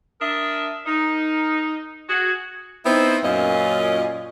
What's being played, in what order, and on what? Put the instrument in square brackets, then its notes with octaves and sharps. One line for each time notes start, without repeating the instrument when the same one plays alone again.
[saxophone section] D4 A#4 E5 [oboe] D#6
[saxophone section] D#4 [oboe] A#4
[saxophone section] F#4 [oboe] G#4
[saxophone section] B3 C4 D#4 E4 C5
F#2 A#2 C#4 F4 D#5